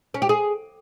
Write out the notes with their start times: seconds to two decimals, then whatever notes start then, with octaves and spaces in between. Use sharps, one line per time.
0.14 C#4
0.22 G4
0.29 G#4